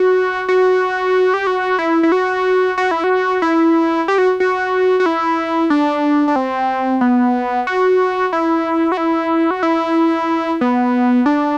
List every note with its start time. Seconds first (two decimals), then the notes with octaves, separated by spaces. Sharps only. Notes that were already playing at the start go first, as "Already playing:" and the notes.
Already playing: F#4
0.48 F#4
1.34 G4
1.47 F#4
1.79 E4
2.03 E4
2.12 F#4
2.78 F#4
2.91 E4
3.04 F#4
3.42 E4
4.08 G4
4.18 F#4
4.40 F#4
5.00 F#4
5.06 E4
5.70 D4
6.28 D4
6.36 C4
7.01 B3
7.67 F#4
8.33 E4
8.92 F#4
8.97 E4
9.51 F#4
9.63 E4
10.61 B3
11.26 D4